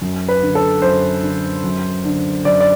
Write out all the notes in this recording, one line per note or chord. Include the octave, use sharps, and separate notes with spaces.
F#2
B4
D3
A4
F#2 C5
D3
F#2
D3
F#2 D5
D5